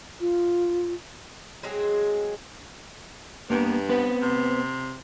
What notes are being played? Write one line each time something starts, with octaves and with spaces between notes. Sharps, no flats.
F4
F#3 G#3 C4 G#4
G2 A#3 B3
B3 C4 B4
C3